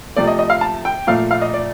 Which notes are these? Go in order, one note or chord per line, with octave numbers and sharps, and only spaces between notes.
C3 F3 A3 D5
D#5
D#5
F5
A5
G5
A#2 F3 A3 F5
F5
D#5
D5